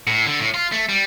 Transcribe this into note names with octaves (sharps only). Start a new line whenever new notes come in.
A2
D3
A2
F4
A3
G3